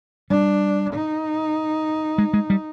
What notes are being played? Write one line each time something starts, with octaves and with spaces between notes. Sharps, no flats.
G3 D4
D#4
G#3
G#3
G3